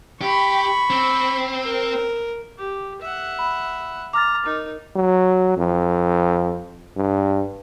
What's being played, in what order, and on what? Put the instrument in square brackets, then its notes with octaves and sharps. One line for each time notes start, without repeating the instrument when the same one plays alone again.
[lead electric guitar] G4 [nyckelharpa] B5 C#6
[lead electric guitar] C4
[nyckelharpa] A#4
G4
E5 F#5
[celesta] B5
[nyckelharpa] A#5 [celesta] D6 F6 A6
[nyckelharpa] D#4 A#4
[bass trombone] F#3
F2
G2